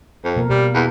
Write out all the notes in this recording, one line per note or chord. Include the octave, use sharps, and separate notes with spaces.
F2
B2 A#3 A#4
B2 G3
E2